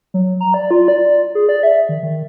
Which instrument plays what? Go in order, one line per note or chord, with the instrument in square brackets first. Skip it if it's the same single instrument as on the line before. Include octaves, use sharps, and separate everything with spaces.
[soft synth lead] F#3
A#5
D5
F4
D5
G#4
D5
E5
D#3
D#3